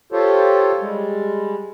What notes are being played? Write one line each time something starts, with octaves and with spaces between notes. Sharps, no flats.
F4 G4 A4 C5 C#5
G3 G#3